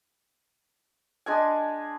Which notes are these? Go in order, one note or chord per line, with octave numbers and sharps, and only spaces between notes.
G#3 D4 G#5